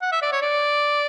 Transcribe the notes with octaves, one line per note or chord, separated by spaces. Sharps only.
F#5
E5
D5
C#5
D5